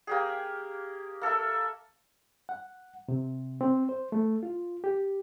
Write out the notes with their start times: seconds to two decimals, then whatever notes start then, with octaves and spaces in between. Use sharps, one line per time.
0.07 A#3 G4 G#4
1.22 A#3 A4 A#4 E5
2.49 F#5
3.08 C3
3.61 C4
3.89 C5
4.12 A3
4.43 F4
4.84 G4